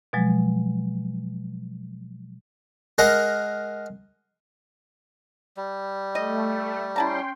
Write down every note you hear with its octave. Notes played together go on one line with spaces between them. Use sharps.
B2 F3 F#3 G#3
G#3 A#4 F#5
G3
A3 D#5
C#4 E4 G5 A5 A#5 C6